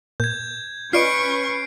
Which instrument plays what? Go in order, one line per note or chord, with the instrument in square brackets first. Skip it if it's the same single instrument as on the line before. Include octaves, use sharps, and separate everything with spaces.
[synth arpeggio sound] A#2 [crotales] G6 G#6
[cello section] C#4 B4 [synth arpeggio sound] F4 D5 D#5 [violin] C#6 [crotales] C7 D7